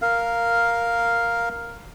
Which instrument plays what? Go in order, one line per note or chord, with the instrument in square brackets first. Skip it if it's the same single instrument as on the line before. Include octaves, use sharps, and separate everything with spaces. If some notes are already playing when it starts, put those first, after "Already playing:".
[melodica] A#4 F5